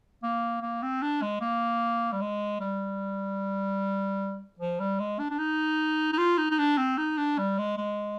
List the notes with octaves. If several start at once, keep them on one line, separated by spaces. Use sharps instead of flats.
A#3
A#3
C4
D4
G#3
A#3
G3
G#3
G3
F3
G3
G#3
D4
D4
D#4
D#4
F4
D#4
D#4
D4
C4
D#4
D4
G3
G#3
G#3